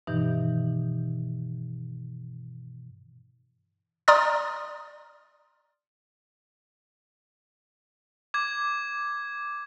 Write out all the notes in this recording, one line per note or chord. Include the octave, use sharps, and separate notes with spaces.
G2 B2 D#3 E3 D#4 G6
D5 A#5 C6 D#6 F6 A6
D6 G#6